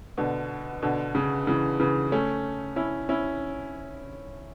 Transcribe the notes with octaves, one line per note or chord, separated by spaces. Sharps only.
B2 D3
B2 D3
C#3
C#3 E3
C#3 E3
A3 C#4
C#4 E4
C#4 E4